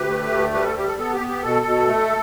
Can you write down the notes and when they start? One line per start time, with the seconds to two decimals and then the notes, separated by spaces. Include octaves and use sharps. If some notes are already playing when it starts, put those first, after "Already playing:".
Already playing: D2 G4 B4
0.08 A3
0.31 D2
0.54 G3 G4 B4
0.65 A4
0.76 G3 G4
0.88 A4
0.98 B3 A4
1.14 G4
1.20 B3
1.28 G4
1.43 B2 A4
1.65 B2
1.88 A3